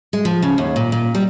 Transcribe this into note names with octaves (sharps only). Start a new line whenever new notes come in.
G#3
F3
C#3
D#2
A#2
A#2
G3